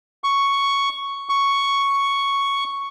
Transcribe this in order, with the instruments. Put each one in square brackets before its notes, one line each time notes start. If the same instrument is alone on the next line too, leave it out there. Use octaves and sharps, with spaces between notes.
[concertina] C#6
C#6